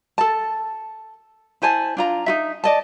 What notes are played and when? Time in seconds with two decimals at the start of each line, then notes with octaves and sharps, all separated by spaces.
0.18 A4 A5
1.62 E4 C5 G#5 A5
1.97 D4 F4 A#5
2.26 D#4 F#4 E5
2.64 D5 D#5 A5